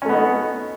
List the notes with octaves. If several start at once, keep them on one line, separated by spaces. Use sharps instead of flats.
A3 B3 C#4 D#4